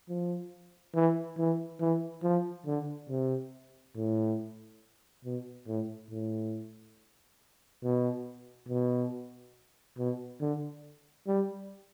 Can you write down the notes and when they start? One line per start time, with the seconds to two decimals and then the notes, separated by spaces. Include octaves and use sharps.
0.09 F3
0.94 E3
1.38 E3
1.80 E3
2.23 F3
2.66 D3
3.09 C3
3.96 A2
5.25 B2
5.67 A2
6.10 A2
7.83 B2
8.68 B2
9.98 B2
10.41 D3
11.27 G3